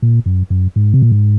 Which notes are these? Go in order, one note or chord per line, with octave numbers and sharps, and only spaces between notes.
A#2
F#2
F#2
G#2
C3
A#2
G#2